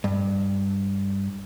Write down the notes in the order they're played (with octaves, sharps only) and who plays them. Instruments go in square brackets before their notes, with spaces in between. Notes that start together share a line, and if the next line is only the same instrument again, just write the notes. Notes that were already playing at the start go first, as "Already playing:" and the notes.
[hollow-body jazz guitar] G2